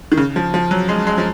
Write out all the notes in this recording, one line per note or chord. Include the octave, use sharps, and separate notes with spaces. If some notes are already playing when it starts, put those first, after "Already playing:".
D#3
C#3
F3
F3
F#3
G#3
G#3
F3